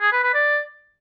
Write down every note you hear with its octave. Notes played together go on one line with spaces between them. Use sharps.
G#4
B4
B4
D5